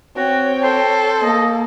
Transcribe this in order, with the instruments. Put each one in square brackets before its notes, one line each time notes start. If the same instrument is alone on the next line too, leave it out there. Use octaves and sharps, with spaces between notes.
[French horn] C4 [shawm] F#4 [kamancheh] C#5 G5
[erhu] A4 [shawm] C5
[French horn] A#3 [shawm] D#5